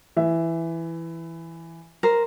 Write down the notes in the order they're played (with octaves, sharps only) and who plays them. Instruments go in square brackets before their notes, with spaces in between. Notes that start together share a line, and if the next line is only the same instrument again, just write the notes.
[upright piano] E3 E5
[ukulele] A#4 C5